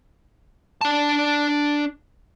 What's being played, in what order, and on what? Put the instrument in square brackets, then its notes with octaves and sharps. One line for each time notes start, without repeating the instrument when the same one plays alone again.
[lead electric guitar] D4 A5